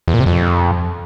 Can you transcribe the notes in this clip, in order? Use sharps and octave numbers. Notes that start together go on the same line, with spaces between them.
E2
A#2
C3
F2